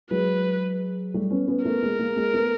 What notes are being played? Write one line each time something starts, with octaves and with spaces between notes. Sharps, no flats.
F#3 G#3 B4
G3 A3
B3 C#4
B3 C#4
A3 B3 A#4
G#3 A#3
G#3 A#3
G#3 A#3
A3 B3